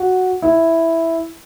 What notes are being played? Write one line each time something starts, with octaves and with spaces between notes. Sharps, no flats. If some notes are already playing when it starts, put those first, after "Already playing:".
Already playing: F#4
E4